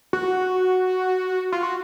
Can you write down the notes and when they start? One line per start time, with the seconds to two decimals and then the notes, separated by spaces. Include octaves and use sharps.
0.13 F#4
1.52 F4
1.63 F#4